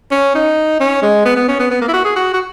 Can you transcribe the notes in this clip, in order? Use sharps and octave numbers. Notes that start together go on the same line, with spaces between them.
C#4
D#4
C#4
G#3
B3
B3
C#4
B3
B3
A#3
E4
F#4
G#4
F#4
F#4